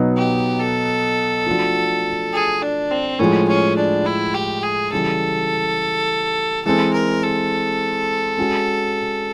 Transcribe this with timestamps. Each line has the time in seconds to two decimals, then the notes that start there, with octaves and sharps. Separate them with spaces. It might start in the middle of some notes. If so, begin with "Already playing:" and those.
Already playing: B2 F#3 B3 D#4
0.17 G4
0.60 A4
1.46 F3 A3 D4 F#4
2.33 G#4
2.62 D4
2.91 C4
3.19 A2 F3 G#3 C#4
3.48 C#4
3.77 D4
4.06 E4
4.35 G4
4.63 G#4
4.92 C#3 E3 G3 A4
6.65 E3 G#3 C4 A4
6.93 A#4
7.23 A4
8.38 G#3 C#4 F#4